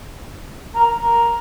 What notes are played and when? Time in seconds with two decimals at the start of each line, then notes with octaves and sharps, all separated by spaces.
0.76 A#4
1.02 A#4